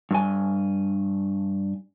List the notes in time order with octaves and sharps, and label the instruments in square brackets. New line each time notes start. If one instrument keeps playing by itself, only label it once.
[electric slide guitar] G2 G#5